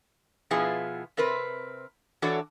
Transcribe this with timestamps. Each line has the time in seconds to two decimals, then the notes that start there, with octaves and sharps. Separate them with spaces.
0.51 B2 F3 B3 E4 F4 G#4
1.17 C3 C4 A#4 B4
2.22 E3 D4 F#4 A4 C#5 D5